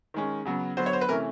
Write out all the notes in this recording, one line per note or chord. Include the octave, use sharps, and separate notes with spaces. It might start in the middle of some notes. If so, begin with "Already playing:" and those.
D#3 G#3 C#4
C#3 F#3 B3
D3 F#3 B3 C5
C#5
C5
B4
C3 E3 A3 C#4 A#4